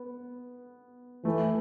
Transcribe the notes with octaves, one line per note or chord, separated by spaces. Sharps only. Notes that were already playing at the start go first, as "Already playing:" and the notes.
Already playing: B3
E3 A3